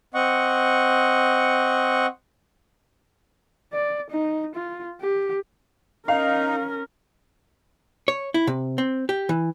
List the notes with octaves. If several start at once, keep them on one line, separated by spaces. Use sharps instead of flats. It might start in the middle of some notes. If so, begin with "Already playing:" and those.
C4 D#5 F#5 C#6
D5
D#4
F4
G4
C#4 D#4 A#4 F5
C#5
E4
C3
C4
G4
E3